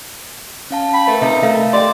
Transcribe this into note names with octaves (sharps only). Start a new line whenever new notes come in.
C#4 F5 A5
G5 B5
A3 A#4 B4
C3 D#4 E5
A3 F5
G4 D5 D#5 G5 C6